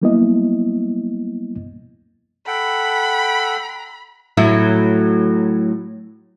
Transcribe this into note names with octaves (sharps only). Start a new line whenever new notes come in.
F#3 G3 A#3 B3 E4 D#5
A4 F#5 G5 B5
A2 F#3 E4